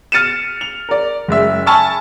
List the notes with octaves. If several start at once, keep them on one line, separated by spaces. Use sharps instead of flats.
F6 A6 C#7 D#7 E7
F7
A#4 D5
F#1 G#3 E5
G#5 A5 B5 C#6 E6 F6